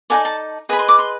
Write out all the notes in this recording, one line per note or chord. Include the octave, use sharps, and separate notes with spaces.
D#4 F#4 A4 D5 G#5
A5
G#4 B4 D#5 B5
C6
D6
C6